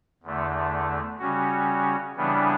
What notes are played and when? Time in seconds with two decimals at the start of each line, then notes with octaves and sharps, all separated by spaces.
0.23 E2 D3 A3
1.19 C#3 G3 C#4 F#4
2.16 C#3 E3 G3 B3 D4